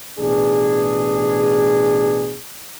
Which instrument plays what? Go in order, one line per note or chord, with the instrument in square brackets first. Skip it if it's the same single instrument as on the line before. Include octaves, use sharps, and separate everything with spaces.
[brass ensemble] A1 B2 D4 G#4